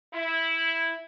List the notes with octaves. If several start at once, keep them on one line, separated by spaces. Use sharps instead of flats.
E4